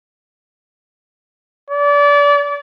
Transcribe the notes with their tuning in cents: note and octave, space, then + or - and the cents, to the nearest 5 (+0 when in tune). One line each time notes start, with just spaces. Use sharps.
D5 -30